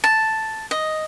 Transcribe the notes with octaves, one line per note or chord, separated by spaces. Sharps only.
A5
D#5